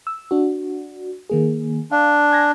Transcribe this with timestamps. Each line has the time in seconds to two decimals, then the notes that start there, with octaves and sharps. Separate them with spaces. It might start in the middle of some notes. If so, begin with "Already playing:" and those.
0.07 E6
0.31 D4 F#4
1.30 D#3 A#3 G#4
1.91 D4 F5
2.31 G#5 G#6 A#6